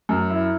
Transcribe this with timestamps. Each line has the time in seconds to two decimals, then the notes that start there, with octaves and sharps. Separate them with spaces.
0.09 F#2
0.30 E4